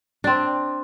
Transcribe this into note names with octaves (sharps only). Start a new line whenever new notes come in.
C4 D4